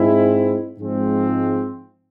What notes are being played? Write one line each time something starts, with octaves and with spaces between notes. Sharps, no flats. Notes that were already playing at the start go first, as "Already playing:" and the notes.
Already playing: G#2 G#3 C4 E4
G#2 F3 G#3 C4